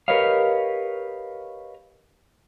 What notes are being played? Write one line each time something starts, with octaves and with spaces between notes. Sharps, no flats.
G4 A#4 B4 C#5 D#5 F5